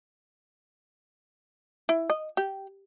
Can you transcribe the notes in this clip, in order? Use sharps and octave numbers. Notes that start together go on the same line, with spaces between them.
E4
D#5
G4